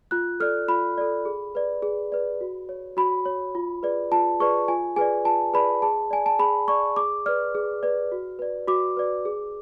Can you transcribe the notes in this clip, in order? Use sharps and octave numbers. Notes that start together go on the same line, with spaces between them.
F4 F#6
A4 D5 F6
F4 B5
A4 D5
G#4
B4 D5
G#4
B4 D5
F#4
C#5
F#4 B5
C#5
F4
G#4 B4 D5
F4 A5
G#4 B4 D5 C#6
F4 G#5
G#4 B4 D5 G#5
F4 A5
G#4 B4 D5 B5
G#4 A5
D5 G#5
A5
G#4 B5
D5 C#6
G#4 D6
B4 D5 F6
G#4
B4 D5
F#4
B4 D5
F#4 D6
B4 D5
G#4